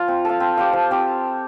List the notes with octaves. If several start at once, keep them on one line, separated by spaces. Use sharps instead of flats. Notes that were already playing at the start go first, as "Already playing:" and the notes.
Already playing: F3 F4
C4
A4 F5
C4
G4 C5 F5
F3
C4 G4